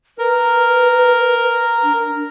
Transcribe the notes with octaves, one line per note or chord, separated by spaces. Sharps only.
A#4 B4
D4